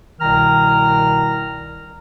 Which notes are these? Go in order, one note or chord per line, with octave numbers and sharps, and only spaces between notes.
C2 B2 D#3 A#5 F6